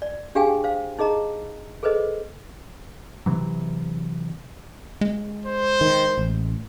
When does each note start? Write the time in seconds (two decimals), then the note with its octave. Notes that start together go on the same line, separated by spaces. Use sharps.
0.02 D5
0.35 D4 G4 G#4 F5 G5 G#5
0.64 C5 F5
0.99 D#4 G#4 D#5 A#5
1.83 G#4 A4 B4 C5 D#5
3.26 C3 E3 F#3
5.01 G#3
5.46 C5
5.81 D#3
6.18 A1